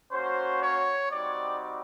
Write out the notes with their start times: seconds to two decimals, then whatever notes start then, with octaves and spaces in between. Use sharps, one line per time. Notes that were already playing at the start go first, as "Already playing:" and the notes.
0.12 A#3 C#4 F#4 C5
0.61 C#5
1.11 G3 C4 D#4 F#4 D5